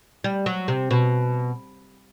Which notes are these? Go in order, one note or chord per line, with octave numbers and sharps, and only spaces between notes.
G3
F#3
C3
B2